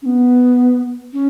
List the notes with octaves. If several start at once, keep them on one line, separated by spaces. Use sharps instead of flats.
C#4
B3
C#4